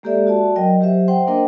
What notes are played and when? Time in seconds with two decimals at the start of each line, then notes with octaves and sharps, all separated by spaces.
0.03 G#3 A#3 G4 A4 D5 E5
0.27 F#4 D5 A5
0.56 F#3 A#4 D#5 G5
0.81 F#3 G4 C5 E5
1.08 C5 F#5 G5 C6
1.27 A#3 D4 A#4 C5 D#5 G5